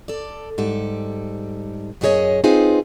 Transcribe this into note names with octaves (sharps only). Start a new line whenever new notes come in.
A4 D5
G#2 G3 A4
F#2 A#2 D4 G#4 C#5 D#5
C4 D#4 F4 G#4 B4 C5